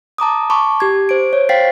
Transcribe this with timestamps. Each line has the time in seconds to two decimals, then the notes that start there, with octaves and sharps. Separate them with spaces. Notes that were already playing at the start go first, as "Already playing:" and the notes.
0.18 A5 A#5 D6 D#6
0.50 A5 B5 C#6 D6
0.80 G4 G#6
1.09 C5 D7
1.33 C#5
1.49 C5 F5 G5 A6 B6 C7